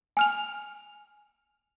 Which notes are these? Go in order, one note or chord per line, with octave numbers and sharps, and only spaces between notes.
G#5 F6 F7